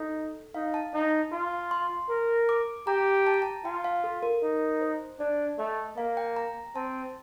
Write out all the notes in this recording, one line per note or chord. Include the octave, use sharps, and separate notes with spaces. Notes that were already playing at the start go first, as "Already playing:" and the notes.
Already playing: D#4 A4
D#4 F5
A5
D#4
F4
C6
A#4
D6
G4 A#5
A5
A#5
A5
F4 G5
F5
A4
A#4
D#4
C5
D4 D5
A3 D#5
A#3 F5
G5
A#5
C4 A5